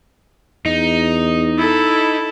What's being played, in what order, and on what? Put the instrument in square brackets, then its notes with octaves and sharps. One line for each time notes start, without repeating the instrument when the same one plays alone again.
[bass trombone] E2 [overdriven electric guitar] D#4
[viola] E4 A4